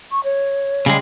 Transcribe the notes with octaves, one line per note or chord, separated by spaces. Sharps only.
C#6
C#5
C#3 G3 G#3